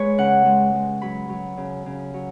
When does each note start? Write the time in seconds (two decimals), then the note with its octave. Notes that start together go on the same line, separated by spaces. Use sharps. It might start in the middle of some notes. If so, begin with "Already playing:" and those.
Already playing: G#3 B4 C#5
0.18 C#3 F#5
0.45 G#3
0.74 G#3
1.02 F#3 B5
1.29 F#3
1.57 C#3
1.86 C#3
2.14 F#3